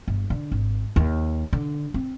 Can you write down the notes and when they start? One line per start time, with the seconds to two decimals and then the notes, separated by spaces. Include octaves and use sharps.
0.08 G1
0.30 D3
0.52 G#1
0.96 D#2
1.53 D3
1.94 C4